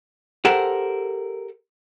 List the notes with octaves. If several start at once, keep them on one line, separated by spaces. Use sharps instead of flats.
G4 A4 A#4 C5 F#5